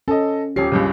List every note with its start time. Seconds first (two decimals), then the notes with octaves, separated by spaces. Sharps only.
0.08 C#4 A4 D#5
0.56 D#1 C#4 G4 C7
0.72 C#2 G2 C#3